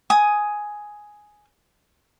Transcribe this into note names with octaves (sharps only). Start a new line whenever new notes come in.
G#5 D#6